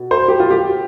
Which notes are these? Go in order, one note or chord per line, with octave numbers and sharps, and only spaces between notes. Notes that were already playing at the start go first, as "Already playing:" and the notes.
Already playing: B2
C5
G4
F4
G4